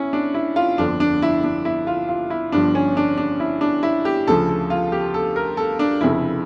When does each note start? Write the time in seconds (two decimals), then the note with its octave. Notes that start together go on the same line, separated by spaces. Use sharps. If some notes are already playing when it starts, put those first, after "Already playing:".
Already playing: C#4 E4
0.13 D4
0.34 E4
0.56 F4
0.78 G1 F2 D3 F3 D4
1.00 D4
1.22 E4
1.44 D4
1.65 E4
1.87 F4
2.09 F4
2.30 E4
2.52 G1 G2 F3 D4
2.75 C#4
2.97 D4
3.18 D4
3.40 E4
3.61 D4
3.83 E4
4.05 G4
4.27 D2 C#3 F3 A4
4.49 A4
4.70 F4
4.92 G4
5.14 A4
5.36 A#4
5.57 A4
5.79 D4
6.01 F1 F2 C#3 E4